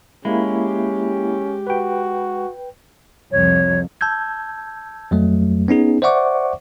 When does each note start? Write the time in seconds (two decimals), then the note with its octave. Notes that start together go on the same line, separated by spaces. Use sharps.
0.25 G#3 A#3 C#4 E4 G4
1.67 F#4 B4 G5
3.32 C2 F2 C#5
4.01 A5 E6 G6 G#6
5.11 F2 F#3 A3
5.68 B3 C#4 D#4 G#4
6.02 C5 D5 E5 F#5 C#6 D6